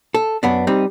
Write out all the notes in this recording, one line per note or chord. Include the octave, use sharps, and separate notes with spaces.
A4
F#2 B3 D4
G3 C4 D#4